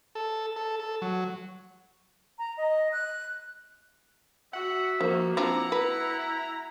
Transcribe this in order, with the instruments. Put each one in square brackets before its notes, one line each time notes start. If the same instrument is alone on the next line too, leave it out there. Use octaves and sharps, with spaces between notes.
[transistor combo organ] A4
A4
A4
F#3
[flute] A#5
D#5
F#6
[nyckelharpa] F#4 [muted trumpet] E5 [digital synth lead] F#5
[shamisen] D#3 [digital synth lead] F3 [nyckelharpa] A#3 F#4
[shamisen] C4 D4 F4 [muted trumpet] E4 [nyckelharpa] F#5 [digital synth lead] A#5
[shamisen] B4